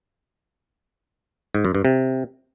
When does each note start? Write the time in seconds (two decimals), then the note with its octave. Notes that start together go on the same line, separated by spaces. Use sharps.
1.55 G#2
1.65 F#2
1.75 G2
1.85 C3